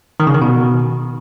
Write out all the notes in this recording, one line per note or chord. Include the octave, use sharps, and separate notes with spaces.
D#3
C#3
D#3
B2